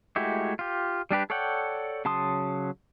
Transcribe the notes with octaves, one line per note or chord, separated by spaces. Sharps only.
G#3 A3 E4 F#4 G4
F4 G4
G3 D4 G4 B4
A4 C#5 D5 F#5 G5
C#3 F#3 A5 C6 D#6